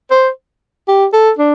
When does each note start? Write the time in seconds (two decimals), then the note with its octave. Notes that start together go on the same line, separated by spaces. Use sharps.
0.11 C5
0.88 G4
1.13 A4
1.38 D4